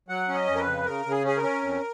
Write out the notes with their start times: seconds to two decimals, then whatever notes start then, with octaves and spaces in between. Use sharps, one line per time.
0.08 F#3 F#5
0.28 C#4
0.34 D#5
0.47 F2
0.56 A#4
0.60 B4
0.67 C#3
0.86 C#3 A#4
1.05 C#3
1.11 G#4
1.24 C#4 G#4
1.37 A#4
1.43 C#4
1.63 F2